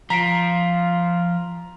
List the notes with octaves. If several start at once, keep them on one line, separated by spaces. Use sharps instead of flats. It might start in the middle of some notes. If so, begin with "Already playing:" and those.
F3 F4 A#5 B6 C7 D7